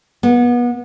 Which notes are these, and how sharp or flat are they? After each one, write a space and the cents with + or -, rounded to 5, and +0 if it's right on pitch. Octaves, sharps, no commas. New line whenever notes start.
B3 -30